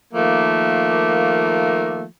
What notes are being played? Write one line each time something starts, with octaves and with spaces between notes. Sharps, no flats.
D#3 F3 A3 A#3